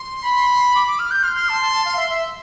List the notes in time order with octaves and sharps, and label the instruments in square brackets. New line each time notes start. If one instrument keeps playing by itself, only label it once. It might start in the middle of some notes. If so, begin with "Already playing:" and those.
Already playing: [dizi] C6
[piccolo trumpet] B5
[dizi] D6
D6
F6
G6
[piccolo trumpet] C6 [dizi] F6
[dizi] F6
A5
A5
A5
F5
E5
E5